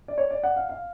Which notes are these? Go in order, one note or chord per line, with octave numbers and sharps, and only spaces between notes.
D5
C#5
D5
F#5
F5
F5